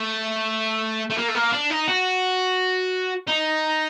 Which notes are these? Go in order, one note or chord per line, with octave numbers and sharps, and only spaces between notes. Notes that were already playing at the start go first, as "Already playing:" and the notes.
Already playing: A3
A3
A#3
A3
A#3
D4
D#4
F#4
D#4